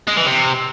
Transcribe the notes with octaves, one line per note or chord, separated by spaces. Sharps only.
G#3
E3
C3